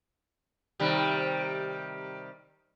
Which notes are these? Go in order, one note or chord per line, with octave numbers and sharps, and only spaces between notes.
C3 D#3 G3